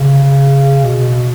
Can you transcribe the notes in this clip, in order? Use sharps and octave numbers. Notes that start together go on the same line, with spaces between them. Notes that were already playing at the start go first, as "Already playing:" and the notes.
Already playing: C#3
B2